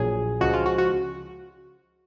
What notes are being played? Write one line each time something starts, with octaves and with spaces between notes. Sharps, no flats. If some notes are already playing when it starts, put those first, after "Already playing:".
Already playing: A#1 A#2 F#3 G#4
C#2 C#3 F3 G#3 F#4
F4
F#4
F#4